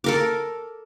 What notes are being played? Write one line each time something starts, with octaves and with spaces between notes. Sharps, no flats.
A4 A#4 D6